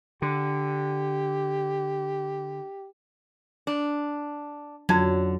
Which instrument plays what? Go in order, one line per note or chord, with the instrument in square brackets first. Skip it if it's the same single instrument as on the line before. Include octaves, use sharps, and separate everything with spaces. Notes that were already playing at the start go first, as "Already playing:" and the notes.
[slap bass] D3 [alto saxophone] G4
[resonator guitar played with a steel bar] D4
[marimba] F2 G#6 [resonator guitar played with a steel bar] D3 [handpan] F#3